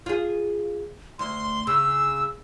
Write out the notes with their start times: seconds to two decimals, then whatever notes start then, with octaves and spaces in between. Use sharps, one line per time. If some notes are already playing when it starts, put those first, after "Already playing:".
0.06 F4 G#4
1.19 D2 C6
1.67 C#3 E6